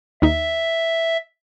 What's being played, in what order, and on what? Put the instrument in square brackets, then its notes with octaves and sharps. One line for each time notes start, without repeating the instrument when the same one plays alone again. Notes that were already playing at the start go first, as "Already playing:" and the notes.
[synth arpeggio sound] D#2 D#4 [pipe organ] E5